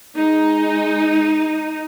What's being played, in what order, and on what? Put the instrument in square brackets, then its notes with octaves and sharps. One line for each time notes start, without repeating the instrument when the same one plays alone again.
[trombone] G#3 [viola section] D#4